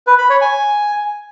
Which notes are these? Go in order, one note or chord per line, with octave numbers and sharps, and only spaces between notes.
B4
B5
C#5
G#5